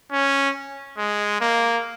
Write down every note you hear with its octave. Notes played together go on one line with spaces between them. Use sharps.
C#4
G#3
A#3